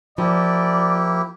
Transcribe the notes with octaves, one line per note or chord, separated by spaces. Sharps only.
F3 A#3 E4 G4 D5